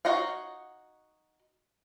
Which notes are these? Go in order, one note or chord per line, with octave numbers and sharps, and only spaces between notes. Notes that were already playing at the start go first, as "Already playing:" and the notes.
D#4 F#4 C#5 F5